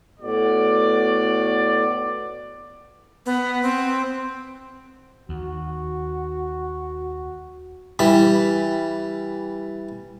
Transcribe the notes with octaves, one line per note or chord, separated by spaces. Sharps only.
A2 B3 F#4 D5
B3
C4
D#2 F#4
E3 G3 B5